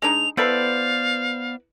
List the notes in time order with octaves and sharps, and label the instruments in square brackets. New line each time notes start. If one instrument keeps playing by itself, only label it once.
[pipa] G#3 D4 D#4 [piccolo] F7
[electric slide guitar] B3 C5 D5 [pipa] E4 A4 B4 [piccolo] F5